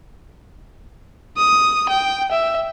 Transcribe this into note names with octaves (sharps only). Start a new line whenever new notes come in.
D#6
G5
E5